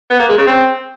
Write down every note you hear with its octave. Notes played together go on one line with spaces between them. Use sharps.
B3
A#3
G#3
C#3
C4